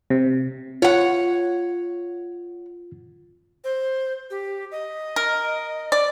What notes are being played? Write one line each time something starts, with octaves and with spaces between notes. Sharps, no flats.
C3
F4 C#5 F#5
C5
G4
D#5
A#4
D5